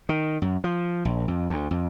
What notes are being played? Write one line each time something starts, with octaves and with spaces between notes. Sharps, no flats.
D#3
F#2
F3
A#1
F2
D2
F2